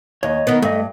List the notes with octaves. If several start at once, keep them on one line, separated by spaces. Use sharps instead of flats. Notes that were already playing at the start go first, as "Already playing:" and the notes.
D#2 C#5 D#5
D#3 B3
G2 A3 D#5